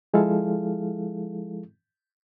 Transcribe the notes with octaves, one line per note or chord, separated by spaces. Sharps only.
F3 G#3 E4 G#4 A4 F5